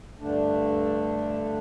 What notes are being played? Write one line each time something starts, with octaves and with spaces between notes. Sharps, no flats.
G2 D3 A3 D4